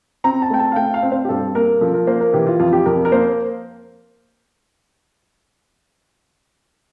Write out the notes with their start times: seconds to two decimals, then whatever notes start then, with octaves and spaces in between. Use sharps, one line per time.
0.24 C4 A#5
0.42 A5
0.50 A3 G5
0.59 A5
0.72 F5
0.76 A3 G5
0.94 F5
1.03 C4
1.12 C5
1.25 G4
1.29 G2 A4
1.55 A#3 A#4
1.81 F3 A4
1.94 A#4
2.07 A#3 C5
2.20 A#4
2.33 E3 G4
2.47 F4
2.59 F2 F4
2.73 G4
2.86 F2 A#4
3.05 A#4
3.12 A#3 C5